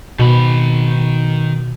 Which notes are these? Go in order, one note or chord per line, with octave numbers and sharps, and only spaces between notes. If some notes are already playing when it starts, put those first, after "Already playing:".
B2 D#3 B5